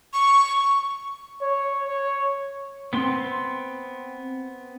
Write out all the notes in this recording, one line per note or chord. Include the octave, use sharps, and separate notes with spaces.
C#6
C#5
C#5
B3 C4 C6